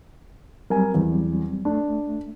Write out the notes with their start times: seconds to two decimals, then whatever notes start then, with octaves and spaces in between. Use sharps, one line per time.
0.70 F#3 G3 C4 A#4 G#5
0.94 E2
1.65 A3 D4